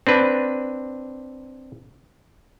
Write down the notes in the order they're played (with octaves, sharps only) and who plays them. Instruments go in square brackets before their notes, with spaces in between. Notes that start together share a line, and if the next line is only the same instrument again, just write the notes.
[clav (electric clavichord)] C4 D4 B4